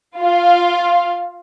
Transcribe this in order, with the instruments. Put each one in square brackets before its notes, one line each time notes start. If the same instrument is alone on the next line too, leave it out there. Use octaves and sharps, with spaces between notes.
[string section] F4 F5